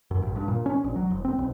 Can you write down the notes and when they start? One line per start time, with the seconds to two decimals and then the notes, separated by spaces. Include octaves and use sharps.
0.11 F#2
0.22 A1
0.36 G2
0.48 A#2
0.66 C#4
0.84 A#1
0.96 F#3
1.11 E1
1.25 C4
1.39 B1